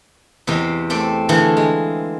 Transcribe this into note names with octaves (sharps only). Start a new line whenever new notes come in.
E2 C3 G4 C5 D#5
A3 C4 D5
D3 E3 A3 F4 G#4
G#3